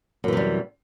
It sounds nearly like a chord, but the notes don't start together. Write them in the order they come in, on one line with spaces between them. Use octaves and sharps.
F#2 E3 C3 G3